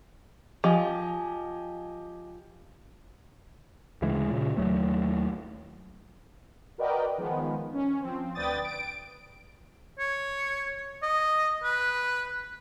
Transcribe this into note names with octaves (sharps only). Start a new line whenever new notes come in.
F3 G4 D#5 G#5
D2 C#3 E3 G#3
A#2 C#3
D#2 F#3 A3
F#4 A#4 B4 D5 D#5 G5
D#3 F3 G#3 B3
C#4
F3 C4
D2 B4 D5 G5 D#6 A6
D7
C#5
D#5
B4